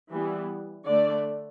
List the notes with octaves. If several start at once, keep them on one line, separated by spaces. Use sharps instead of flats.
E3 G3 B3
D3 A3 D4 D5